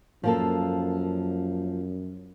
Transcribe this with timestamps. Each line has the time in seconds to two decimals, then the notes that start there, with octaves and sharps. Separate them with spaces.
0.24 F#2 F3 A#3 A4